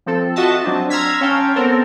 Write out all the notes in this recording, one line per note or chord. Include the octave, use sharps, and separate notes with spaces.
F3 C4 A4
F4 F#4 D#5 E5 A5
F#3 C4 D4
A#5 C6 E6 F6 G#6 B6
C#4 C#5 F5 G5 A5
B3 C4 A4 A#4